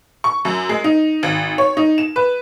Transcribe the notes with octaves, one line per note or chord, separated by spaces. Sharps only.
C#6
F#2
G#3
D#4
G#1
C#5
D#4
E7
B4